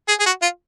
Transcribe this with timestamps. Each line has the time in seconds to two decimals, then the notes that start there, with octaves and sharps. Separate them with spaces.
0.08 G#4
0.20 G#4
0.26 F#4
0.42 F4